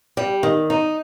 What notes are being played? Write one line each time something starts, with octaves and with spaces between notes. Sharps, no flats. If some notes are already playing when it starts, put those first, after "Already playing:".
G3
D#3
D#4